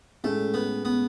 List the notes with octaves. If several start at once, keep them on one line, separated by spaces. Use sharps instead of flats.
A2 G#3 A3 C#4
B3
B3